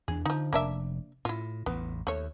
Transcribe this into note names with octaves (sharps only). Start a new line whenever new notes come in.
E2 E3 D4 G#4
D3 F3 D#4
F1 A#3 D4 E5
A2 E4 F4
A1 E2 A2 B3
D#2 A3 C#5